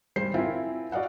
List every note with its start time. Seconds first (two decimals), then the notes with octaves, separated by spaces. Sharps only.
0.16 G3 C5 C7
0.34 C4 E4 F4 A#4 E5 G#5
0.92 F#4 D5 D#5 F5 F#5